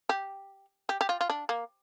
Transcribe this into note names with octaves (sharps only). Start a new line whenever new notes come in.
G4
G4
G4
F4
F4
D4
A#3